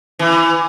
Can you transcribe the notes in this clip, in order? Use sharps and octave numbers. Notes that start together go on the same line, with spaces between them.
E3